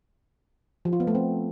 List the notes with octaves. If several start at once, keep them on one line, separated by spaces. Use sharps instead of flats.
F3
F4
B3
A3
C4